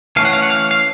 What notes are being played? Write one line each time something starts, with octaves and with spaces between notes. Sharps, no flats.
E3 A3 C#4 F5
F#5
F5
F#5
F5
F5